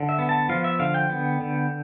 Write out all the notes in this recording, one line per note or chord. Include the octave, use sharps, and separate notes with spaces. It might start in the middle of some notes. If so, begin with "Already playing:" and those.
Already playing: D3
E5
B3
A5
F3 F5
E5
D3 F5
G5
B3
D3